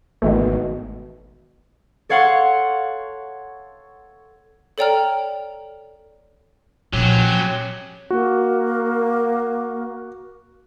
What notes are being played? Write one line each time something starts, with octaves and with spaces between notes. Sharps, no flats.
G#1 B2 D#3 E3 A3
A4 C#5 F5 F#5 C6 C#6
A4 C#5 D5 G5 A#5 F6
A#2 F3 F#3 C#4 G4
A#3 F#4